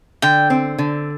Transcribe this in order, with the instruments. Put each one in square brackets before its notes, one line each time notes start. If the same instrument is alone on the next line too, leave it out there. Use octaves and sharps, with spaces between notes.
[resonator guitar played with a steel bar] D3 [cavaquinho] G5
[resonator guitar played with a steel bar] C4
D3